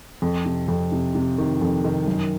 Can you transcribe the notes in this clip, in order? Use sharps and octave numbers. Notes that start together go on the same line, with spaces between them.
F2
C3
F2
C3
C3
D#3
F2
D#3
F#2